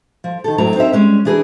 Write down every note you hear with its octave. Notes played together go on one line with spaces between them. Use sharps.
F3
D#3 A4
F#2 A2 F#3 C4 A#5
C4 D#4 A#4 E5
G3 G#3 C#4
E3 D4 G#4 A#4 B4